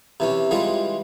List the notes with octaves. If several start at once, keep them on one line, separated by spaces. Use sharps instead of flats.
C3 E3 C#4
E3 G3 G#3 F4